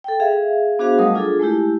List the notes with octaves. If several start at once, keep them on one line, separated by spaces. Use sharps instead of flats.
A4 G5
G#4 E5 F5
B3 D4 F#4 G#4 C5 F5
F#3 G3 A3 A#4 D#5 D#6
D4 F4 G#4 A4
G#3 A3 E4 G4